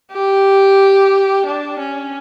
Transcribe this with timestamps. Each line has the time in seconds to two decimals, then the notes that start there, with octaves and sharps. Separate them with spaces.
0.12 G4
1.46 D4
1.79 C#4